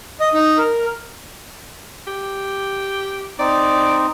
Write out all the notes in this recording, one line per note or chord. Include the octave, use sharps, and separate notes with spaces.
D#5
D#4
A#4
G4
C4 D#4 D5